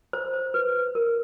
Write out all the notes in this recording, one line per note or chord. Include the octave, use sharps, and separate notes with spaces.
C5
C5
B4
A#4